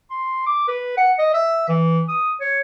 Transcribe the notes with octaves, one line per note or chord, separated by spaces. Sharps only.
C6
D6
B4
F#5
D#5
E5
E3
D#6
C#5